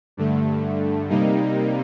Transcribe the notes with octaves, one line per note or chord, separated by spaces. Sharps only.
G2 D3 A3
C3 G3 A#3 D#4